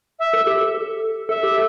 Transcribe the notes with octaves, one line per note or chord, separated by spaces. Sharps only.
E5
A4
G4
A4
A4
A4 E5
G4